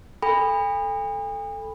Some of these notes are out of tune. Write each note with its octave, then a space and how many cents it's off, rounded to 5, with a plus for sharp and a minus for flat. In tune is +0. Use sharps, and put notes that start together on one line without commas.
A4 +0 G#5 -45 B5 +0